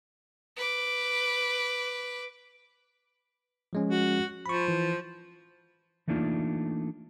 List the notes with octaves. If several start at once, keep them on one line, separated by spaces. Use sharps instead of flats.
B4 D6
F3 G#3 C#4
F#4
F3 B5 C#6
E3
E3 A3 A#3 D4 D#4 F4